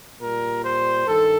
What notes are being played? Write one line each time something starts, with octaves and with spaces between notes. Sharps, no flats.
A#2 G3 A#4
C5
G2 D#3 A4